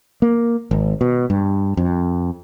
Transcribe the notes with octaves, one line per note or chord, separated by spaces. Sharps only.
A#3
G#1
B2
G2
F2